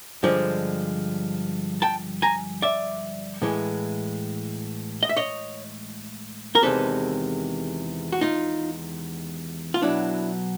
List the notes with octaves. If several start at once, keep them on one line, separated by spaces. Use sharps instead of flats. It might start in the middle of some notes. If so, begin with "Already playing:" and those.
G2 D3 F3 G#3
G5 A5
G#5 A#5
D5 E5
A2 E3 G#3
D#5
E5
C#5 D#5
A#4
E2 C3 D#3 G#3 A4 B4
F#4
D#4 F4
F4
B2 F#3 D4 E4